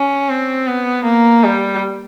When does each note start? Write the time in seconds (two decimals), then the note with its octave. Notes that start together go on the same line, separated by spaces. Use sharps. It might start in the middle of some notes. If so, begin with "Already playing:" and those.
Already playing: C#4
0.29 C4
0.67 B3
1.05 A#3
1.44 G3